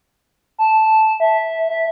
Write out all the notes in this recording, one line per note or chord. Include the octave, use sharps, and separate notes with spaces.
A5
E5
E5